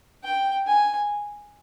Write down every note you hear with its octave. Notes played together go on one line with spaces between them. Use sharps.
G5
G#5